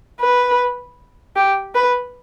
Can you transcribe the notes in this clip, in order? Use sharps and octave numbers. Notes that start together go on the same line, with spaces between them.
B4
G4
B4